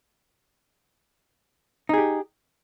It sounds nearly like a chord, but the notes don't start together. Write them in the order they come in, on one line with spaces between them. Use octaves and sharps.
D#4 G#4 G4